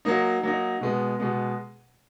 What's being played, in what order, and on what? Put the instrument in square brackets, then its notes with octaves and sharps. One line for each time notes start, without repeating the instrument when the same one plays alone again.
[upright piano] F#3 A#3 D#4
F#3 A#3 D#4
B2 G#3 B3
B2 G#3 B3